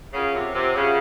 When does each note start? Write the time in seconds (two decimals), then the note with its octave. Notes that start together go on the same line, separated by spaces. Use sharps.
0.14 C#3 F4 A#4 C#5 F#5
0.35 C3
0.55 C3
0.75 C#3 F4 A#4 C#5 F#5